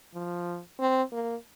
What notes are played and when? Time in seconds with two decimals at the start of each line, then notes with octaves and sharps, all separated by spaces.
0.14 F3
0.80 C4
1.13 A#3